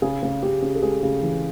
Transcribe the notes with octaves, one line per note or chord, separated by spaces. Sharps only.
C#3 G#4
C#3
C#3 G4
C#3
A4
G#3 G#4
C#3
E3